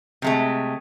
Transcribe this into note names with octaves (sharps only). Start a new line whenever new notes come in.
C3 G#3 A3